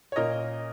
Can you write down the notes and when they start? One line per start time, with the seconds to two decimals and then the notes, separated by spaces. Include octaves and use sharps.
0.12 C#5
0.16 A#2 A#3 C#4 A#4 D#5